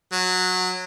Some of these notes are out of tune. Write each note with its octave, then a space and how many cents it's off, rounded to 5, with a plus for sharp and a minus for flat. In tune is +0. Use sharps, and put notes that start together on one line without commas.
F#3 -15